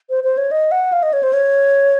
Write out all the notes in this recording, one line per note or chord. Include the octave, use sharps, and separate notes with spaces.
C5
C5
C#5
D#5
F#5
F5
D#5
C#5
C5
C#5